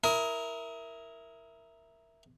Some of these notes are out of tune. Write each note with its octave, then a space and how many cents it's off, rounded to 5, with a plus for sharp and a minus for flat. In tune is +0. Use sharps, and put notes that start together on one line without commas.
E4 +0 A#4 +0 D#6 +30